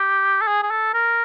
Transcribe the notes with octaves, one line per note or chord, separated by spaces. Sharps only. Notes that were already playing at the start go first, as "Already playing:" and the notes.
Already playing: G4
A4
G#4
G#4
A4
A#4